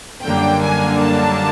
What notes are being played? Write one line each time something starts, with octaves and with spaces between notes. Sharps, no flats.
F#2 D3 G3 A#3 D4 G5
G#5
A5